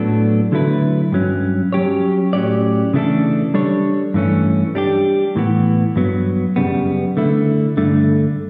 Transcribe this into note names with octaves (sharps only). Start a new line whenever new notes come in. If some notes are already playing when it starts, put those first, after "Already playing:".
Already playing: A2 F#3 B3 D4 A4
D3 F#3 A3 E4 B4
G2 F#3 C#4
F#3 C#4 G4 C#5
A2 F#3 C#4 G4 D5
C#3 E3 A3 D4 A4
G3 D4 A4 C#5
G2 E3 A3 C#4
G3 D4 G4
A2 E3 B3
G2 F#3 B3
F#2 C#3 G3 B3
D3 A3 E4
G2 D3 A3